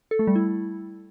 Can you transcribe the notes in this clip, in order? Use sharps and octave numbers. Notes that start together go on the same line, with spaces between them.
A4
A3
G3
E4